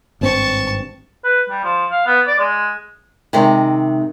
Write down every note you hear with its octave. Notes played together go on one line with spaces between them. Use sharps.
G#1 G2 C4 A5 C#6
B4
G3
F3
F5
B3
D5
G#3
C3 D#3 G#3